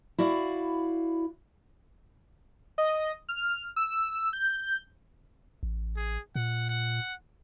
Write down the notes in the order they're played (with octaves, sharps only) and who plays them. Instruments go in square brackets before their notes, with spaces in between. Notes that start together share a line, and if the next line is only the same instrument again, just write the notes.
[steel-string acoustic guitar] E4 F#4 D5 F5
[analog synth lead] D#5
F6
E6
G6
[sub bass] A1
[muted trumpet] G#4
[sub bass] A#2 [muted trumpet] F#5
[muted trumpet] F#5